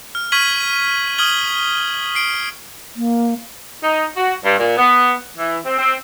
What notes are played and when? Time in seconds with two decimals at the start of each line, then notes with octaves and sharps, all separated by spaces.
0.15 F6
0.32 C#6 F6 G#6 B6 D#7 F#7
1.18 D#6 F6 G#6 F#7 G7
2.15 C7 D7
2.96 A#3
3.83 D#4
4.16 F#4
4.44 G2
4.58 A#2
4.78 B3
5.37 E3
5.65 C4
5.79 C4